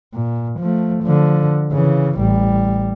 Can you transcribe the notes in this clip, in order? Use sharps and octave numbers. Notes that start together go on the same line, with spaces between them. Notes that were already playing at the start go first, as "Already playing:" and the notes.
A#2
F3 A3
D3 F3
C#3 E3
A1 G3